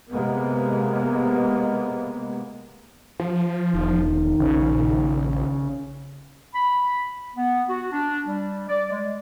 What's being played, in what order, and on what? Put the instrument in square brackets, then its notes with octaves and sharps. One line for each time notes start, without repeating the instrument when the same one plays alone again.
[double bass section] C3 G#3 A#3 B3
[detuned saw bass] F3
[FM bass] E1 [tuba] D#3
[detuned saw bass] A#1 [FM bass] C#3
[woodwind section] B5
B3
F#4
D4
G3
D5
G#3